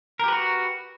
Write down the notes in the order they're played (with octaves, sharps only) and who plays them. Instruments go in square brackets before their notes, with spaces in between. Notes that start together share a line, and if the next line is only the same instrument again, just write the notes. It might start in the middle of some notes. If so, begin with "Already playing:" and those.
[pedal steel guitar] A#4
G4
B4
F#4